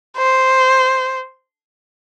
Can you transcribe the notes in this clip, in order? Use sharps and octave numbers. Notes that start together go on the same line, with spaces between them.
C5